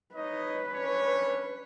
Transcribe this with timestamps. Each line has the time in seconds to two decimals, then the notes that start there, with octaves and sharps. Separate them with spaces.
0.15 D#4 B4 C#5 D#5
0.73 C#4 D4 C#5